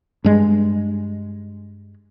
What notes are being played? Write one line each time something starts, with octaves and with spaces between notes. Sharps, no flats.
G2 G#3